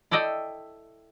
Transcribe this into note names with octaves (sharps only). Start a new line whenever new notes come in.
E4 A4 D5 D#5 G5